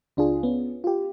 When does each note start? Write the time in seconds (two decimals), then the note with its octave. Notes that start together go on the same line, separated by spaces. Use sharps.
0.17 C#2 D4 F4 G#4
0.43 B3 C#4
0.84 F4 G4